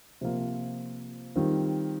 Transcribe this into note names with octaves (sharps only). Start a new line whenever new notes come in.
C3 F3 A#3 F4
D#3 G3 C4 F4